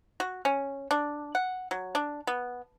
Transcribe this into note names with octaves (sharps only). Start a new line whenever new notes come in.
F#4
C#4
D4
F#5
F#3
D4
B3